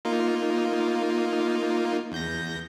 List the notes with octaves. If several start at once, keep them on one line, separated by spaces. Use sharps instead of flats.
A#3 D#4 F4
E2 G6 A#6